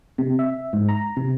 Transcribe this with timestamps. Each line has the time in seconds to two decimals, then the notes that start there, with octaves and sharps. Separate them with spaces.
0.18 C3
0.39 E5
0.73 G#2
0.88 A#5
1.17 C3